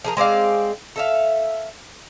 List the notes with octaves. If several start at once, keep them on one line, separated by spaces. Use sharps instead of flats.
F3 G#4 A#4
G#3 C4 D5 F5
A4 E5 F5